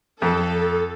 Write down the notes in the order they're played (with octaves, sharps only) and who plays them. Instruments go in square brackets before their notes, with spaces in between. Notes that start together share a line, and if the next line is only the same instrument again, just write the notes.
[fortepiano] F2 [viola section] A4